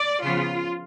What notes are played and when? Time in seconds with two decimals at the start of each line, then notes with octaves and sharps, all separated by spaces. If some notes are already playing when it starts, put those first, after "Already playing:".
Already playing: D5
0.23 C#3 F3 B3 F4